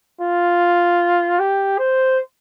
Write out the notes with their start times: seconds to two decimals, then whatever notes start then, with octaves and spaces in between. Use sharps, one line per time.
0.21 F4
1.39 G4
1.78 C5